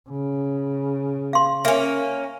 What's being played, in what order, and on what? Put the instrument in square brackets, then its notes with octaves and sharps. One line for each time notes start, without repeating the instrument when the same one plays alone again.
[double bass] C#3
[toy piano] F5 C6
[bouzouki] A#3 C#4 [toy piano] E5